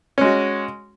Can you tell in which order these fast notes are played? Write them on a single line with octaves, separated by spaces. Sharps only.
C#4 G#3 F#4